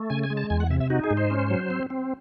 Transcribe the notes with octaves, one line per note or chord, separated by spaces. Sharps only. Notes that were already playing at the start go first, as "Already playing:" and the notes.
Already playing: A3
C#3 G#5
G#5
G#3
A5
E2 G#5
F#5
C3 E5
E5
D#4 F#4
G#4
G#2
C5
C#4
F#3
C4
C4